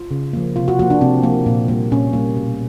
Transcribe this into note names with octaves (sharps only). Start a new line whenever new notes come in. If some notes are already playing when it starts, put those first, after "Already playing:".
Already playing: F4
C#3
F3 A#3
C3 F4
F#4
F3 A#3 F#4
D4
C3 C4
F3 A#3
A#2
G3 A#3
A#2 C#4
G3 A#3
B2